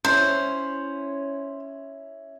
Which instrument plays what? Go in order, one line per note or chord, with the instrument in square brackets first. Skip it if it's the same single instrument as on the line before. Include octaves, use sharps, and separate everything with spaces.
[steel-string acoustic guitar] C#4 E4 C#5 [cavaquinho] C5